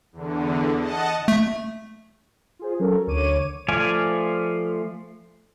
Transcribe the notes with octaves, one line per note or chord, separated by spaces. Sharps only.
E2 D3
D#5 F#5 A5
A3
F4 G#4 C5
F#3 C#4 A4 A#4
D2 D3 C#5 D6 D#7
F3 A3 D5 F5 G#5